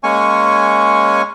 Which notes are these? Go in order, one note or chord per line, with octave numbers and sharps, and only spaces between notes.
G#3 A#3 C#4 C#5 G#5 C#6